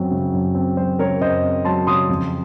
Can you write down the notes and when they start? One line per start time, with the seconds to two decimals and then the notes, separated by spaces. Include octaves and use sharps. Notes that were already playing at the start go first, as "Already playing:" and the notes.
Already playing: F#2 F#3 C4
0.11 C#3
0.33 F#2
0.55 C4
0.77 F#3 C5
0.99 C#3 A#4 C#5
1.21 F#2 C5 D#5
1.43 C4
1.65 F#3 A5 C6
1.87 C#3 C6 D#6
2.09 F2